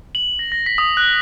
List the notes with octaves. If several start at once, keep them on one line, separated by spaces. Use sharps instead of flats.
F#7
A#6
A#6
B6
D#6
F#6